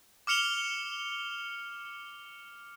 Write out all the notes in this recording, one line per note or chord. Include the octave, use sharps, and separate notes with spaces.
D6 F6 C#7 F7 G7